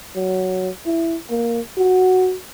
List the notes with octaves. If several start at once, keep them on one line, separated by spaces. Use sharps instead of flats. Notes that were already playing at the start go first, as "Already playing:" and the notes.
F#3
E4
A#3
F#4